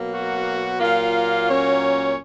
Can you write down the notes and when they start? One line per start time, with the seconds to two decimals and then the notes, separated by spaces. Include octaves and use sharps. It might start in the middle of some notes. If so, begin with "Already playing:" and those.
Already playing: B2 F#3 A#3
0.12 F#4 F#5
0.79 A#2 F#3 A#3 F4 F5
1.47 C#4 C#5